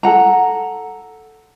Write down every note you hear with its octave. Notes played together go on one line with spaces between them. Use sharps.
A4 F#5 A#5